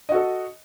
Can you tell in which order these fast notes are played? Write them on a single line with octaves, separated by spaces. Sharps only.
D#5 F#4 A4